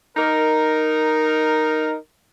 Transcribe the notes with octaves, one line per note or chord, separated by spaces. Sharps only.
D#4 A#4